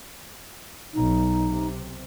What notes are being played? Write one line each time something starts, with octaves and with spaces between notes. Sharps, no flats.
B1 D#4
C3